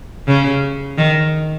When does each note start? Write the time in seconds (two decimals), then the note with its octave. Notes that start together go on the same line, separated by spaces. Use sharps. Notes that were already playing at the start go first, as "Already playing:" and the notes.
0.27 C#3
0.98 D#3